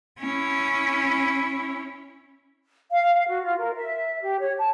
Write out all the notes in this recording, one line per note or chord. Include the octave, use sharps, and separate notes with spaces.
C#4 E4
F5
F5
F#4
F4
A#4
E5
G4
C#5
A5